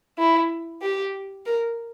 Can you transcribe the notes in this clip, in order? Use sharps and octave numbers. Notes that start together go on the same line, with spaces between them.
E4
G4
A#4